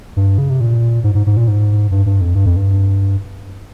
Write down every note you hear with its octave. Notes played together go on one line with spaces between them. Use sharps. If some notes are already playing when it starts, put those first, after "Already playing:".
G2
C#3
C3
A#2
G#2
G#2
G#2
A#2
G#2
G2
G2
F2
G2
F2
G2